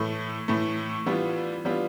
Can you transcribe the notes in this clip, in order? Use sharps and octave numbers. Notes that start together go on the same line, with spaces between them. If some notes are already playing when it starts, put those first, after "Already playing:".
Already playing: A2 E3 A3
A2 E3 A3
E3 G3 B3 D4 F4
E3 G3 B3 D4 F4